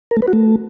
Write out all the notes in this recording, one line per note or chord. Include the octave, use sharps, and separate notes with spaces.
A#4
A3
B4
F#4
A3